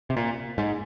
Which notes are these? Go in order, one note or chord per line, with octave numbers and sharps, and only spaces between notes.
C3
A#2
G#2